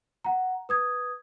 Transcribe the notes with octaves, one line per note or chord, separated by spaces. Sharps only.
F#5 A#5
B4 D#6 G#6